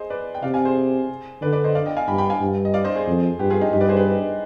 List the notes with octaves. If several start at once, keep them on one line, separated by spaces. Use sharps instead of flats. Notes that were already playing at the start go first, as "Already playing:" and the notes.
Already playing: G#4 C5 D#5
B4 D5
G5
C3 D5 F5
F5 G#5
G#4 C5
D3 B4 D5
B4 D5
C5 D#5
D5 F5
D#5 G5
F5 G#5
G2 G5 B5
G5 B5
F5 G#5
G2
D#5
D5 F5
C5 D#5
G#4 C5
F2
G2 G4 B4
F4 G#4
D#4 G4
G2 D#4 G4
B4 D5
G#4 C5
G4 B4